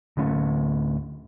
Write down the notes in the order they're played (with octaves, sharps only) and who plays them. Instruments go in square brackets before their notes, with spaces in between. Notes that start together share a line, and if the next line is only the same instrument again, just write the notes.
[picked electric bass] D1 D3 A3 C#4